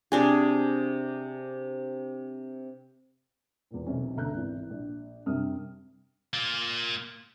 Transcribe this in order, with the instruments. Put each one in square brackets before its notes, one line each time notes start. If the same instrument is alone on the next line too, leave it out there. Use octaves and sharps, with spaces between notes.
[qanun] C3 D4 G#4
[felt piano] E2 A#2
B1 C3 F#3 C#4 C5
G1 D2 E5 A#5 F#6 G6
G#1 E3
A#1
F#2 C3 G3 D4 D#6 F6
[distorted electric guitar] A#3 F4